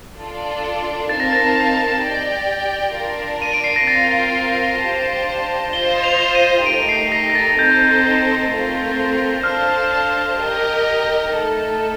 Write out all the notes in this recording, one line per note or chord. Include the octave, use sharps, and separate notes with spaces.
D4 F4 A4 D5
C4 D#4 A#4 F5 A5 A6
A#6
A6
G4 D5 G5
D4 F4 A#4 D5
D#7
D7
C7
A#6
C4 F4 A#4 F5 A6
D4 G4 C5 F5 A5
F4 C5 D#5 G7
F7
D#7
A3 D#4 G4 A#4 D7
C7
A#6
A#6
A6
C4 D#4 A4 C5 G6
A3 C4 F4 A#4
D4 A4 C5 F5 A5 F6
G4 A#4 D#5
A3 D#4 A4